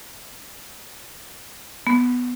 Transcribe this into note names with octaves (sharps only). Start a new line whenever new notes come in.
B3